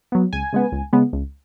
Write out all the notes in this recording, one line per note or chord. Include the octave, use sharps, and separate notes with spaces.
F#3 B3
C#2 G#5
C#3 G#3 B3
C#2
C#3 G#3 B3
C#2